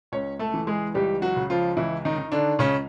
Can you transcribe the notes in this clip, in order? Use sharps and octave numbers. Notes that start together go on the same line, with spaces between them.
C#2 C#4 C#5
A3 A4
E3
G#3 G#4
C#2 G3 G4
F#3 F#4
C#3
F3 F4
C#2 E3 E4
D#3 D#4
D#3
D3 D4
C#2 C#3 C#4